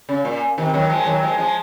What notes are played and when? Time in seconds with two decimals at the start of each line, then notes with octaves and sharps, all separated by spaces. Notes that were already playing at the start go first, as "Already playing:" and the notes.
0.09 C#3
0.25 A#2
0.58 C3 D#3
0.74 D#3 F#3
0.90 F3 G#3
1.06 D#3 F#3
1.23 F3 G#3
1.38 F3 G#3